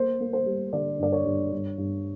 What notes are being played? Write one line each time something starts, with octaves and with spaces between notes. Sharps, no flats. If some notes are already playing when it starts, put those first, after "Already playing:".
Already playing: A#3 C5
A#3
C5
G3
D3 D5
G2 D5
C#5
G2
G2
G2